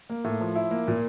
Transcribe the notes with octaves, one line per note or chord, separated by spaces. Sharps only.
A#3
A2
F3
E4
A#3
A#2